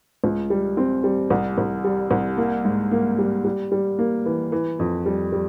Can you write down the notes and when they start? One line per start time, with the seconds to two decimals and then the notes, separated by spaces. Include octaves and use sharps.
0.24 C#2
0.50 G3
0.77 C4
1.04 G3
1.30 C2
1.58 C2
1.84 G3
2.11 C2
2.37 A#3
2.65 G#2
2.91 A#3
3.18 G3
3.44 G3
3.72 G3
3.99 A#3
4.26 E3
4.52 E3
4.79 F2
5.05 G3
5.32 G3